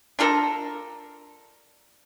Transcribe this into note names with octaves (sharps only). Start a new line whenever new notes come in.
D4 F4 A4 A#4